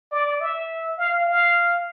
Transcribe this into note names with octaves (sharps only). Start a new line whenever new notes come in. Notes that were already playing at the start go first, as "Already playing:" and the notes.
D5
E5
F5
F5